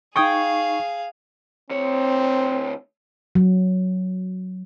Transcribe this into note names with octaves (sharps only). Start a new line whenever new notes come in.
D#4 G#4 F5 G5 C#6 D#6 G#6
D2 C4 C#5
F#3